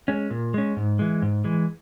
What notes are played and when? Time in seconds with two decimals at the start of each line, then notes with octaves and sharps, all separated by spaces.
0.08 G#3 C#4
0.30 A#2
0.54 G#3 C#4
0.76 G#2
0.99 E3 G#3
1.22 G#2
1.44 E3 G#3